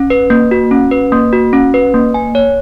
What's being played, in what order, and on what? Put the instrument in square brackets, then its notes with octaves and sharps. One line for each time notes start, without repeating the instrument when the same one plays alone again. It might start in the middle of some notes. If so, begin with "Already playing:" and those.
Already playing: [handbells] C#4
B4
A#3
F#4
C#4
B4
A#3
F#4
C#4
B4
A#3
G#5
C#5